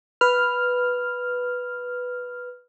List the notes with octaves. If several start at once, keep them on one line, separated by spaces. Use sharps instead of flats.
B4 F6